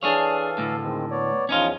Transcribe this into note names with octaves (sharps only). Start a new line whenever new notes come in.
E3 D4 G#4 A4 C#5 F5
D2 A2
D#3 G#3 C4
B3 C#5 D5
E2 F3 C#4 D#4 F4